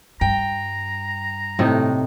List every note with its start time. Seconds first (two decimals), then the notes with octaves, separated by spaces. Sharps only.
0.21 G2 G5 A#5
1.59 A2 C3 A3 D#4